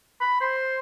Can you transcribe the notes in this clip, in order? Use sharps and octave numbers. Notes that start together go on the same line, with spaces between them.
B5
C5